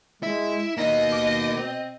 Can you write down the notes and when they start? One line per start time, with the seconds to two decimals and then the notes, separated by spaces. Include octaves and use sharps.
0.23 G#3 E4 E5
0.78 B2 A#3 D#4 D#5
1.12 D6
1.57 C4